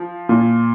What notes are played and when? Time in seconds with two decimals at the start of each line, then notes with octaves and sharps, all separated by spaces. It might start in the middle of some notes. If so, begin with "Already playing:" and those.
Already playing: F3
0.29 A#2